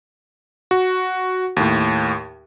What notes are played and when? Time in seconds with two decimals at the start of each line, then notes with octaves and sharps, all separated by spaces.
0.71 F#4
1.56 D#2 A2